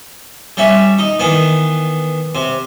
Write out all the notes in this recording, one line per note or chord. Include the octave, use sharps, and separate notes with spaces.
G3 C#4 E5
D#4
D#3 E3 B3
C3